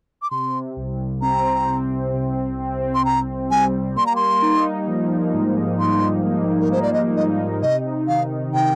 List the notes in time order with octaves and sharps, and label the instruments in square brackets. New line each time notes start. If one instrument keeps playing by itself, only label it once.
[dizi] D6
[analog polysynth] C3 [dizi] C6
[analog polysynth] C2
[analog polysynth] C4 [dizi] A#5
[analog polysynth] C3
C3
C4
[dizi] C6
[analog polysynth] C3 [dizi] A#5
[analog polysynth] G3 [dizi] G#5
[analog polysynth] A#3 [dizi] C6
[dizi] A#5
C6
[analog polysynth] D#4
F3
G#2
[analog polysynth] G#2 [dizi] C6
[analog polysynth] A#3
[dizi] A#4
[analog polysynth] A#3 [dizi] C5
[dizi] D5
D#5
[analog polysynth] D#4 [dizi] D#5
[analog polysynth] C3 [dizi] D#5
[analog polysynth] D#3 [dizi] F5
[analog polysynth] C3 [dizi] G5